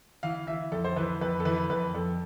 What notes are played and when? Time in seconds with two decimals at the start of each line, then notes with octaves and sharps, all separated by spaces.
0.23 E3 F5
0.47 E3 E5
0.72 F2 A4
0.85 C5
0.96 E3 B4
1.21 F2 B4
1.40 A4
1.45 E3 B4
1.70 F2 B4
1.94 F2 A4